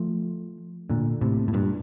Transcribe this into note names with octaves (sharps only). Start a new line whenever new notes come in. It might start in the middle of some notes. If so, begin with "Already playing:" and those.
Already playing: F3 A3
A#2 D3
A2 C3
A2
G2 A#2